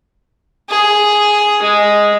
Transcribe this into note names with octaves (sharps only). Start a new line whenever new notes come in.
G#4
G#3